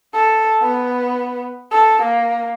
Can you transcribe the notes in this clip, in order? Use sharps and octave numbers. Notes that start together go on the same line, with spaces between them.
A4
B3
A4
A#3